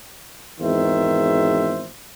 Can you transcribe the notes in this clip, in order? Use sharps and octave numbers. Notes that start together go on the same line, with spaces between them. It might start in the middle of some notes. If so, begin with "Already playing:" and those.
G#1 E2 D#3 C5 E5